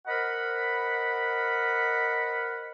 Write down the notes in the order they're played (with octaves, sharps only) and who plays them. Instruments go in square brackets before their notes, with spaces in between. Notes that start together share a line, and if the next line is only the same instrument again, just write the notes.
[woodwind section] A#4 C5 D#5 F#5 B5